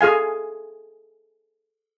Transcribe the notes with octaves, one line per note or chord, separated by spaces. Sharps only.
G#4 A4 F5 G#5